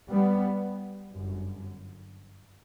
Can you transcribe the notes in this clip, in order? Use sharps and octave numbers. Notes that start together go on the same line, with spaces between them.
G3 B3
G1 F#2